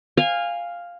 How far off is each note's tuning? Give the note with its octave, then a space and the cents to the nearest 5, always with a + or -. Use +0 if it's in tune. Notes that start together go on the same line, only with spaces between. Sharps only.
F5 +0 G#5 -25